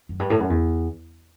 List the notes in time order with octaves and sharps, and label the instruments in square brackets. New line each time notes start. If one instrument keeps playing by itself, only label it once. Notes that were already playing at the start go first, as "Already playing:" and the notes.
[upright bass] F#2
G2
A2
F#2
E2